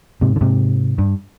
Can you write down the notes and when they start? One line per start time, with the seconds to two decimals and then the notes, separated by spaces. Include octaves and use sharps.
0.21 G#2 C3
0.36 D3
0.41 G#2 C3
0.98 G2